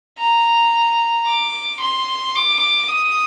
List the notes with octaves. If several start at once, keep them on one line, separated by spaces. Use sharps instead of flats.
A#5
D6
C6
D6
D#6